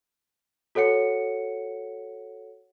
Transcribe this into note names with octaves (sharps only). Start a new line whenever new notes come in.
F#4 A4 C#5 F#5 C#7